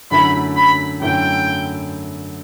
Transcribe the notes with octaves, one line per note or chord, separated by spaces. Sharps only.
F#2 D3 A3 E4 B5
B5
F#2 D3 A3 E4 G5